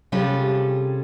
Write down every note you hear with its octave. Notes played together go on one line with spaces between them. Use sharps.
C3 G3 C#4 F4 G#4 A4